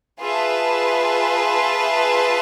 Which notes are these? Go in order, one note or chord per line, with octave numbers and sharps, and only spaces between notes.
F4 G#4 B4 E5 A5